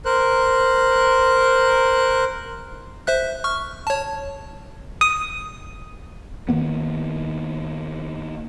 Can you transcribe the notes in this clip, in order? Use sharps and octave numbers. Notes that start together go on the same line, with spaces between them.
A#4 C5 F#6
C5 E5 F#6
C#6 F6
C#5 A5
D#6
D#3 F3 A#3 B3